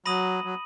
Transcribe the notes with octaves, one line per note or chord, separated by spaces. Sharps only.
F#3 B5 D#6 A#6 D#7 F#7
F#3